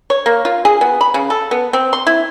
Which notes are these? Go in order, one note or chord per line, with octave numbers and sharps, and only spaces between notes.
C#5
A#3
F4
G#4
B3
B5
C#3
A4
B3
C4
C6
E4